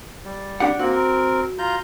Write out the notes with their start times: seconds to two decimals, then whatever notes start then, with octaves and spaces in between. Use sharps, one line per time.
0.25 G3
0.60 D4 G4 F#5
0.79 A#3 C4 F#4
0.92 C4 A#4
1.59 F4 A#5 G6